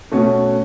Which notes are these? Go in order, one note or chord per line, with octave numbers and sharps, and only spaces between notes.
B2 A3 C#4 F#4